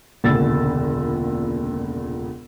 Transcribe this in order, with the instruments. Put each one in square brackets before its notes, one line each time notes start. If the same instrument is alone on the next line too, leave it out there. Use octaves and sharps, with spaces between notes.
[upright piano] E1 C#2 A#2 D3 E6 A6